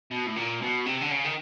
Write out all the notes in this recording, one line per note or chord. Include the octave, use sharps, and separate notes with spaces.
B2
A2
A#2
B2
C3
D3
C#3
D#3